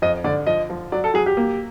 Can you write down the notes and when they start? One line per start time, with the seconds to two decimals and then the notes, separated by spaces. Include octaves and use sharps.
0.02 F2 D#5
0.24 D3 D5
0.47 F3 D#5
0.70 F3
0.92 F#3 D5
1.04 A4
1.14 F#3 G#4
1.26 G4
1.37 A#3